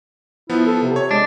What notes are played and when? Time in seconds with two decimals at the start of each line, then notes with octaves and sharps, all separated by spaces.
0.50 F3 B3 E4
0.66 A4
0.83 C3
0.96 C#5
1.11 G#3 D4